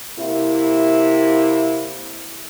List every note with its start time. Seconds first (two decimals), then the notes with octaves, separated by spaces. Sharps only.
0.19 C3 A#3 E4